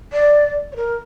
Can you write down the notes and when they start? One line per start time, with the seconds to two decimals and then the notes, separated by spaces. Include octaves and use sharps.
0.13 D5
0.72 C#5
0.76 A#4